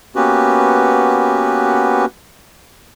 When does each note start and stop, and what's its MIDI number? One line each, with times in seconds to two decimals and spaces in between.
0.16 2.06 58
0.16 2.06 59
0.16 2.06 61
0.16 2.06 66
0.16 2.06 67
0.16 2.06 71